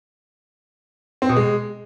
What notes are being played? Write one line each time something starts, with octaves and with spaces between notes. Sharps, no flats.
C4
B2
G#3